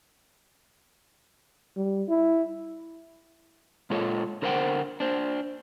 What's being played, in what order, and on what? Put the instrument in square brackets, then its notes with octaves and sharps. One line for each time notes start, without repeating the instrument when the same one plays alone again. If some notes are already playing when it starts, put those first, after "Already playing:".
[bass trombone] G3
E4
[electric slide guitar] A#2 G#3 F4 A4 C#5 D#5
D3 A#4 C5 E5 F#5 G5
D4 C5